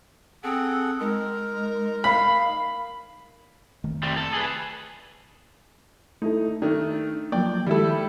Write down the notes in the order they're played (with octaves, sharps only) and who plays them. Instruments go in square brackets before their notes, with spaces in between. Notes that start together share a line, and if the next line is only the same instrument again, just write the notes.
[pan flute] C4 [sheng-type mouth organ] G#4 A4 F#5
[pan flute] G#3 [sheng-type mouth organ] D#4 [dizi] A#4
[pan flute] F5 [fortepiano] B5
[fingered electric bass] F1 D#3 A3
[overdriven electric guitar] G3 C4
A4
G#4 B4
[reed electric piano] A3 E4 A4 [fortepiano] D#4
[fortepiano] D#3 A3 [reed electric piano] D4
[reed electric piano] F3 F#3 A#3 [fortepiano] D5 G5
[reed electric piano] D#3 G#3 [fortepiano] G3 E4 A4